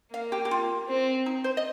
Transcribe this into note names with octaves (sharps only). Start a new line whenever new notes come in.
A#3 F5
G4
G4
F4
C4
D#4
C5
D#5